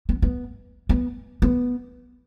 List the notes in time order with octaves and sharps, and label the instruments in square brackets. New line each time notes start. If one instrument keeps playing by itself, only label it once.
[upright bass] B3
B3
B3
B3